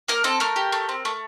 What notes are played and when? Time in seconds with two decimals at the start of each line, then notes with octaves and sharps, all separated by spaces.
0.08 A#3 A#4
0.24 C4 A4
0.40 A3 A#4
0.56 G4
0.72 A3
0.89 C4
1.05 A3